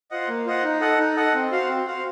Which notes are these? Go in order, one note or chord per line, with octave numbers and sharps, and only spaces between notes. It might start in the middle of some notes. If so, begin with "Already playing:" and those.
F4 C5 D#5 F#5
A#3
F4 C5 D#5 F#5
D#4
A4 D#5 F#5
D#4
A4 D#5 F#5
C4
F#4 C5 F5
C4
F#4 C5 F5